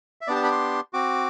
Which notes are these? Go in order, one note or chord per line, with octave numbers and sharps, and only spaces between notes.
E5
B3 D4 G4 D5
A5
B5
C6
C4 F#4 D6